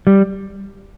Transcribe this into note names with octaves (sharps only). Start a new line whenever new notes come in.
G3